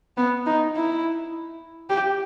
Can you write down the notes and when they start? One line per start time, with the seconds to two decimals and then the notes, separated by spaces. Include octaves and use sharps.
0.17 B3
0.46 D#4
0.75 E4
1.90 G4